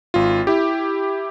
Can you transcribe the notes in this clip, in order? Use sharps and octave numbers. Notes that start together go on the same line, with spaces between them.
G#1 F4
E4 G4